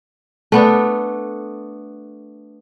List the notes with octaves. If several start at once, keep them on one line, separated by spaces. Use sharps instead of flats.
A3 B3 D4